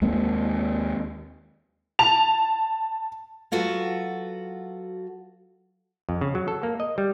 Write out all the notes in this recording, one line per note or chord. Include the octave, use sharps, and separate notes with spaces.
D#2 G#3 A#3 C4
A5 F7
F#3 F4 F#4 A4 B4
F2
C#3
F#3
A4
A#3
D#5
G3